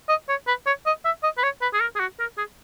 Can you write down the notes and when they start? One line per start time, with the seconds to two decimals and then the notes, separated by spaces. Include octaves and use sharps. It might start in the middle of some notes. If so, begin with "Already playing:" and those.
0.09 D#5
0.29 C#5
0.47 B4
0.67 C#5
0.86 D#5
1.05 E5
1.23 D#5
1.38 B4
1.43 C#5
1.62 B4
1.73 G#4
1.81 A#4
1.96 G#4
2.00 F#4
2.19 A#4
2.38 G#4